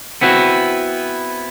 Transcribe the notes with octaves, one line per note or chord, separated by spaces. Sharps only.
B3 C4 E4 F#4